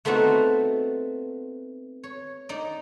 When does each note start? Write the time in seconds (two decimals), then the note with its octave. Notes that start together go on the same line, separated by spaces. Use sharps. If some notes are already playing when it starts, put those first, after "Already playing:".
0.05 A3 B3 C4 D#4 F#4
2.04 C#5
2.49 D#4 D5